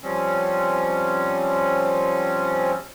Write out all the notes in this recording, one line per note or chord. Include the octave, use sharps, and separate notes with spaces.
F3 G3 C4 C#4